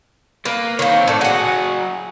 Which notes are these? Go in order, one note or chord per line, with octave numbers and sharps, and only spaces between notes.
A#3 B4
D#3 A#3 C4 C#5
A2 A4 D5
F#3 F#4 G#4 F#5